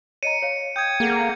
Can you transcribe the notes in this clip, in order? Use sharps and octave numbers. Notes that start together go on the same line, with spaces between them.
C#5 D#5 A#5 C#7 D#7
C#5 F5
G5 D#6 G6 G#6
A#3 G#4 A4 F#5